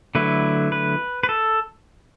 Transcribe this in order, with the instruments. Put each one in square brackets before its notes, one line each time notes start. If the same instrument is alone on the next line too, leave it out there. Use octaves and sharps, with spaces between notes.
[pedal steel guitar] D3 F#3 A3 E4 B4
B4
B4
A4